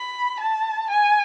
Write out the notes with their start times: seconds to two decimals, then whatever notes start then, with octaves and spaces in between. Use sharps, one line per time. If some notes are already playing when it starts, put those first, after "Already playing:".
Already playing: B5
0.40 A5
0.90 G#5